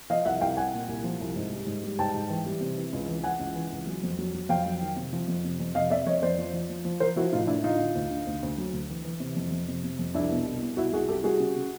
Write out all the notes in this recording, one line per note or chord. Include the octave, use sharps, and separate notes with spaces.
F3 D#5 F5
C2 E5 F#5
C2 F5 G5
C2 F#5 G#5
A#2
C2
F3
C2
G#2
G3
G#2
G3
G#2 G5 A5
G#2
E3
G3
C3
E3
C#2
E3
E3 F#5 G#5
C#2
E3
C#2
F#3
F2
F#3
F#3
F2 F5 G5
F#3
D#3
C3
F3
F2
C3
F2
C3 D#5 F5
C3 D5 E5
F2 C#5 D#5
F2 C5 D5
F3
F3
F3
F3
F3 A#4 C5
F3 E4 F#4
A2 D#4 F4
A2 D4 E4
D3 D#4 F4
D3
D2
D3
D2
D2
F#3
D2
E3
E3
C3
F2
F2
C3
C3
F2
C2 D4 E4
B2
C2
B2
C2 E4 F#4
C2 F#4 G#4
C2 G4 A4
G3 F#4 G#4
C#3
C#3